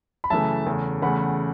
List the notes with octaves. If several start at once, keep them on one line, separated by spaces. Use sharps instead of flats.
B5
F#2 C#3 E3 A3 E5 A5
E2 C#3 A3
E2 C#3 A3 F#5 B5